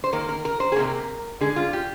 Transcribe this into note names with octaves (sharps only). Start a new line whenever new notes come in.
C5
D#3 A#3 A#4
A#4
A#4
C5
G#4
C3 D#3 A#3 A#4
D3 G#3 G#4
F4
G4